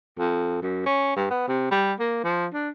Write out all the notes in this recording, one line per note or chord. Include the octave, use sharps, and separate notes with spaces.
F2
F#2
C#4
G2
B3
C3
G3
A#3
F3
D4